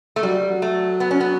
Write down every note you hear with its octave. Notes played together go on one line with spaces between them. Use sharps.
A3
F#3 G3
F#3
A3
B3
C#4
B3